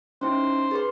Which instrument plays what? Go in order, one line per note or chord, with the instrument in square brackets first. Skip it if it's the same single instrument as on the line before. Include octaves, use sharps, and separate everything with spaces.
[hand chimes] C#4 D#4 E4 [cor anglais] C5
[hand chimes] G#4 B4 C6